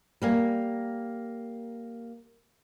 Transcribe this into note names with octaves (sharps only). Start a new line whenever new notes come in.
G3 A#3 G#5